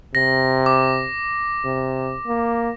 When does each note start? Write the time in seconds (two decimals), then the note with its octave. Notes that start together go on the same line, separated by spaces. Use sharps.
0.15 C3 A#6
0.66 D6
1.65 C3
2.27 A#3